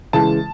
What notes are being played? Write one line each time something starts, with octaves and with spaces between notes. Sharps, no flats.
C#3 E3 G#3 A5